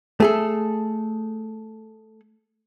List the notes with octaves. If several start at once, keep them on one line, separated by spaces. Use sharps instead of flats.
A3 G#4 A4